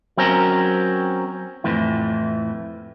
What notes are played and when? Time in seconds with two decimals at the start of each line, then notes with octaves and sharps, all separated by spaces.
0.17 F#3 C4 C#4 A#4
1.64 F2 A2 E3